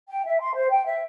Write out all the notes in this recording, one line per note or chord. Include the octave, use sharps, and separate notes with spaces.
G5
E5
C6
C5
G5
E5